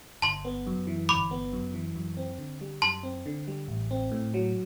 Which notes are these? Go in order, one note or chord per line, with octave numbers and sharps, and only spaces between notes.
G1 A5 C6
B3
F#2
E3
G1 B5 D6
B3
F#2
E3
F#2
C4
D3
G3
F#2 A5 C6
C4
D3
G3
A1
C4
A2
F#3